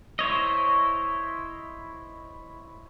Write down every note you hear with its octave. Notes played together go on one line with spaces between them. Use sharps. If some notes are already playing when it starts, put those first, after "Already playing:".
E4 C5 C#5 D#5